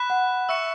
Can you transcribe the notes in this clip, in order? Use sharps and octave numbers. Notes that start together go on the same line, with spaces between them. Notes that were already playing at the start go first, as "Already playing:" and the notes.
Already playing: B5 F#6 B6 E7
F#5
E5 C#6 E6 C#7 E7